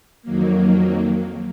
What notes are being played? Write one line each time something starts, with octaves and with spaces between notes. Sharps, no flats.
F2 D#3 F#3 A#3